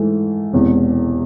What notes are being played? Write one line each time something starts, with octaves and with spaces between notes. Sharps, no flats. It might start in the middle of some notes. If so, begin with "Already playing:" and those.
Already playing: G#2 E3 A3
E1 E2 C3